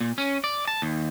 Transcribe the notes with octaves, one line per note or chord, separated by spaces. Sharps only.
A#2
C#4
D5
A5
D#2